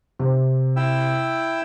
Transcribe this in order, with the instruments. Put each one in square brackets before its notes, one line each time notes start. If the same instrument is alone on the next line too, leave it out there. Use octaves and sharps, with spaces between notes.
[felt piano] C3
[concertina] E4 G5 E6